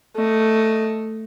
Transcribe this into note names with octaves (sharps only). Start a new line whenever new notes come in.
A3 D#5